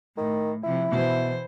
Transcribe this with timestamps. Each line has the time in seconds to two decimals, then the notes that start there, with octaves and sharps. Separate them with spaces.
0.17 A2 D#3
0.64 C3 F3 E4
0.92 B2 E3 C5